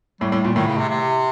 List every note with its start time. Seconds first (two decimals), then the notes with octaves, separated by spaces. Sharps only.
0.20 A2 G3
0.32 A2
0.44 A#2
0.55 A2 D#3
0.67 C#3
0.77 C3
0.89 C3